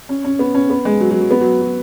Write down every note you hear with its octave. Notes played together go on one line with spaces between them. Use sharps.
C#4
C#4
B3
C#4
B3
G#3
F#3
F#3
F#3
B3
F#3
F#3